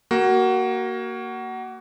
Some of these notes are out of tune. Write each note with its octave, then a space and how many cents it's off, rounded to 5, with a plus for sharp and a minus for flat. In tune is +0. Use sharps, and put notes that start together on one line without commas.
A#3 +0 F#4 +20